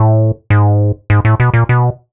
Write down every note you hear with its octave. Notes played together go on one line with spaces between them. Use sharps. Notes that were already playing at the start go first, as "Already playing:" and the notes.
Already playing: A2
G#2
G#2
A2
B2
A#2
B2